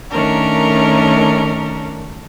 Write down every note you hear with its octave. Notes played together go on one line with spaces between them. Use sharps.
D#3 A3 C#4 D4 A#4